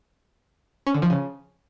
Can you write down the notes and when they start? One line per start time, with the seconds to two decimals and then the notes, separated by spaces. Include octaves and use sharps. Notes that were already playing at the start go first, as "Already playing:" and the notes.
0.87 C#4
0.94 D3
1.02 F3
1.10 C#3